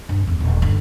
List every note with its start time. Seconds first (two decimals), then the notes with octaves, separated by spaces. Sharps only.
0.09 G2
0.27 E2 B3
0.40 D#1
0.62 G2 D3